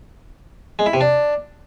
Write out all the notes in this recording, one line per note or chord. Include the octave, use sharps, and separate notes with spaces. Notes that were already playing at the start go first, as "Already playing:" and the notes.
G#3
E4
C3
D4